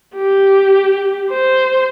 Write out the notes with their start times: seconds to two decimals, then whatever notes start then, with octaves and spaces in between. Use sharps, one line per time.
0.16 G4
1.31 C5